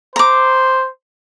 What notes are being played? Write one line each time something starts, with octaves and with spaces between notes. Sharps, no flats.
C5 A#5 D6